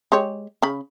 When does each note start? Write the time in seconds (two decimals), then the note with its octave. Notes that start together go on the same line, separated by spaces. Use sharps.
0.12 G#3 G4 C#5
0.62 C#3 B5